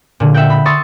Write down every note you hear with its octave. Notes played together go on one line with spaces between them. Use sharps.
A#2 D3
E5 F#5 G5
B5
C6 C#6 D#6 E6 A6